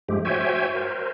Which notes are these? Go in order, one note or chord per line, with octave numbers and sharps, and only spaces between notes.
G2 F3 G#3 A3 G4
F#4 C5 C#5 E5 G5 G#5
A#4 C5